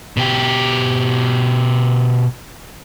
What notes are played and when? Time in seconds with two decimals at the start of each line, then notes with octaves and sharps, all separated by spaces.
0.17 B2 G4